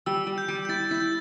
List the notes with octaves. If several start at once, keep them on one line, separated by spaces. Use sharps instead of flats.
G3 E6
G3
G6
G3
G6
E4 A6
E4 G6
A6